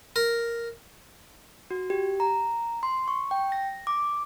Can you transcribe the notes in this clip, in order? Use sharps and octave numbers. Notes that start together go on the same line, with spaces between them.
A#4
F#4
G4
A#5
C6
C#6
G5
A#6
D6